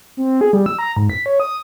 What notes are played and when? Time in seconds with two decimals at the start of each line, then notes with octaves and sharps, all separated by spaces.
0.17 C4
0.41 G#4
0.53 G3
0.66 E6
0.79 A#5
0.96 G#2
1.10 B6
1.26 C#5
1.40 D#6